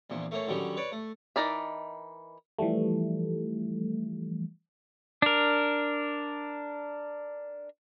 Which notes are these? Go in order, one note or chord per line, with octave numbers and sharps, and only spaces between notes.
A#1 E2 A#2
A3 A#3 C#4
D3 D#3 F#3 G3 C#4
B4 C#5 D5
A3
E3 D#4 A#4 D5 E5
E3 F3 G3 A3
D4 A#4